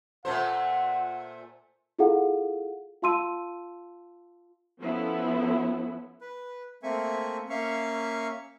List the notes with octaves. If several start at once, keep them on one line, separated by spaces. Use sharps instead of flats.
A#2 A3 C5 F#5
E4 F4 G#4 A4 F5 F#5
F4 F5 A5 C6 E6 D#7
F3 B3 C#4 E4 A4
B4
A3 A#3 C4 E5 G#5 C#6
A#3 C#4 E5 F5 C#6